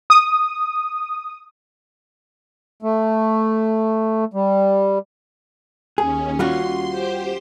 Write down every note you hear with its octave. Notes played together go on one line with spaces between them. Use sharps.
D#6
A3
G3
D#2 C#4 G#4
G3 F4 F#4 C6
G4 C5